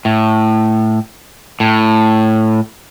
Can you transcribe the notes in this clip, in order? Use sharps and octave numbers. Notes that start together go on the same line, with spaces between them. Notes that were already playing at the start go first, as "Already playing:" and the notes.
A2
A2